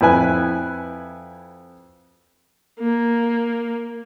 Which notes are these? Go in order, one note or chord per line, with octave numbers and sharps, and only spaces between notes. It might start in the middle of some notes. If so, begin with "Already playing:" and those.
F2 E4 B4 G#5
A#3